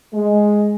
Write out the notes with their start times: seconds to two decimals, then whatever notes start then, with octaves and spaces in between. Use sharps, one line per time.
0.13 G#3